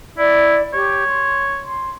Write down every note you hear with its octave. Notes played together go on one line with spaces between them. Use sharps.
E4 D5
G4 C#5
C6
C6